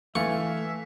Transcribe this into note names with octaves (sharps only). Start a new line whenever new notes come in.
E3 A3 E5 F5 G#5 C#6